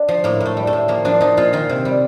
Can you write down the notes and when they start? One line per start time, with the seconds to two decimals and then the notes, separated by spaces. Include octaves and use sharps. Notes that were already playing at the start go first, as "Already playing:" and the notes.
Already playing: D4
0.08 F3
0.24 A2 A#3
0.40 A2
0.46 A3
0.57 G3
0.67 A3
0.73 A2
0.88 F3 A#3
1.05 F3 D4
1.21 F3 D#4
1.37 A#2 F4
1.53 D#3 F4
1.69 C3
1.85 G3